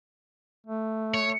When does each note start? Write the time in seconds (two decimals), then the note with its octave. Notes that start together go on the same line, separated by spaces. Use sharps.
0.67 A3
1.14 C#5